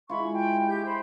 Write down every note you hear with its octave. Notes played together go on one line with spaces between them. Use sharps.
G#3 E4 F4 B5 C#6
G5
G4 G6
C5 B5